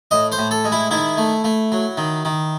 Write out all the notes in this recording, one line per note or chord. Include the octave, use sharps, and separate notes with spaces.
A2 D#5
C5
A2
A4
G#3
E4
D#3 E4
A3
A3
F#3
D#3
D#3